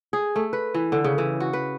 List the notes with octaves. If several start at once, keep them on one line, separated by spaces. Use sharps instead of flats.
G#4
A3
B4
E3
D3
C#3
E3
F#4
B4